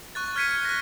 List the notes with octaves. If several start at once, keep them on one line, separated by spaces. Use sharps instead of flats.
C#6 F#6 A6
F6 G#6 B6 C#7 D#7
F#6 A#6